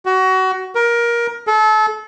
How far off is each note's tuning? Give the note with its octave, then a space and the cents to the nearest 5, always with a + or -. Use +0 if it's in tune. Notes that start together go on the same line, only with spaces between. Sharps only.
F#4 +25
A#4 +20
A4 -30